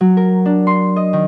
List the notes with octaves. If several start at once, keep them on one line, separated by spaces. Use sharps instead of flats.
F#3
A#4
D4
C6
D#5
D#3